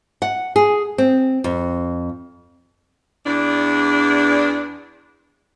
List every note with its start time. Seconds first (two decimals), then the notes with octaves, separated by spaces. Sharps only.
0.22 F#5
0.56 G#4
0.98 C4
1.44 F2
3.26 E2 D4